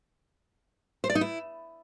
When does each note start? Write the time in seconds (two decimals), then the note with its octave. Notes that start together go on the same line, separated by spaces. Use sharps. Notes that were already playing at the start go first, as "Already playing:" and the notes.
1.04 C5
1.10 D5
1.15 D#4
1.21 E4